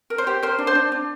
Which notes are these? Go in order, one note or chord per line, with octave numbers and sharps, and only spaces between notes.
A#4
C5
G4
A#4 C5
D4
C5
D4
D4